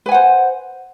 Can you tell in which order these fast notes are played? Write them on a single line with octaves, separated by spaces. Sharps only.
B4 G#5 F#5 C5